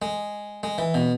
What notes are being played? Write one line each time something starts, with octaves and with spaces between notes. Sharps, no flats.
G#3
G#3
E3
B2